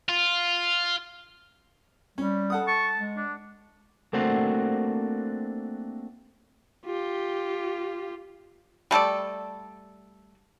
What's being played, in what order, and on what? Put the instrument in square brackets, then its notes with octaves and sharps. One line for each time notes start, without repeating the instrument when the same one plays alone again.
[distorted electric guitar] F4
[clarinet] G3 [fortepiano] C#4
[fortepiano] A4 F#5 D#6
[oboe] A5 [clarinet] C#6
[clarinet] G#3
[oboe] D4
[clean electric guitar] A3 A#3 C4 D4 F#4 C5
[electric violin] F4 G4
[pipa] G3 A3 A4 D5